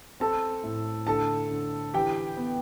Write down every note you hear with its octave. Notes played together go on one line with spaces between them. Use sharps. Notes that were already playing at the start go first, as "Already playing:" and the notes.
C4 A4 A5
A2
D3 A4 A5
D3
E3 G4 G5
B3